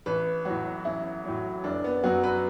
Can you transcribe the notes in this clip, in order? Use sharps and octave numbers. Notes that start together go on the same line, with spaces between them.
A1 B4
A2 F#3 F#4
A1 E4
A2 F#3
F#1 D4
B3
F#2 F#3 F#4
B4